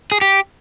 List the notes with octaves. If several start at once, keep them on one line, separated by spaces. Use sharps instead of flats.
G#4
G4